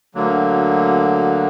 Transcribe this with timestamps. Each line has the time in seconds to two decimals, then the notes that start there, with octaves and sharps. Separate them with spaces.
0.15 D2 D3 F#3 A#3